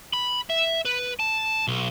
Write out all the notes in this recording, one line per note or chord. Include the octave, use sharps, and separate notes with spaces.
B5
E5
B4
A5
B1